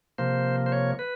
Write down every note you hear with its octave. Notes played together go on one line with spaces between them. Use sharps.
C3 F3 A#3 C5
C5
C#5
B4